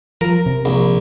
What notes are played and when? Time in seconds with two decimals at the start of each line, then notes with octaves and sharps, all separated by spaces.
0.21 F3 A#4
0.46 C3
0.65 A#1